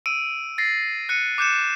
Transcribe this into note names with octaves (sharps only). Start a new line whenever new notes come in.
E6 D7 D#7
A6 A#6 C7
F#6 C#7 D#7
D6 F#6 G6 C#7 E7